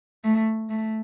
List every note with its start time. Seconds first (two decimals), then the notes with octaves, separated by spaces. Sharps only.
0.24 A3
0.70 A3